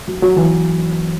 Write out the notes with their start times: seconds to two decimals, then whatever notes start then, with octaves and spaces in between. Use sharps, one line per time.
0.08 F#3
0.22 F#3
0.37 E3